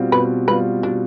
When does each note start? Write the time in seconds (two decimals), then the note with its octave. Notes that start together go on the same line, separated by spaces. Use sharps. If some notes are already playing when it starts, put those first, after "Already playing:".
Already playing: B2 G3 C4 F4
0.12 B2 B4
0.48 G3 C4 F4 B4
0.83 B2 D4